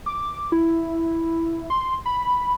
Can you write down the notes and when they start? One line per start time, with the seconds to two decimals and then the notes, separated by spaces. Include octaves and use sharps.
0.06 D6
0.52 E4
1.70 C6
2.06 B5